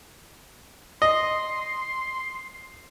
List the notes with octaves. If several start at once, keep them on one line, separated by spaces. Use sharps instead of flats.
D#5 C6